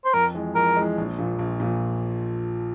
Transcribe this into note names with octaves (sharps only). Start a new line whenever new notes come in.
C5
F2 A#4
E3 G#3
F2 A#4
E3 G#3
A#1
A#2 F3
A#1
A#2 F3